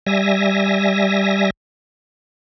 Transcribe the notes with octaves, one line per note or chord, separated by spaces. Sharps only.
G3 E5 G#5 A#6